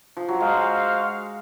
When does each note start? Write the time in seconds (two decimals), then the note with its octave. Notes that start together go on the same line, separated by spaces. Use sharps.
0.17 F3
0.28 F#3
0.40 G#3 F#4 C5 F5